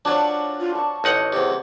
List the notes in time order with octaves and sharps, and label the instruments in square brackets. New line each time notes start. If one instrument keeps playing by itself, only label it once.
[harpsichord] F3 F#3 F#4 [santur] D4
[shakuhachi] F4
[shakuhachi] A5 [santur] C#6
[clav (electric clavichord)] A1 D#4 F#5
[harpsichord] E2 C3 [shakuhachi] C5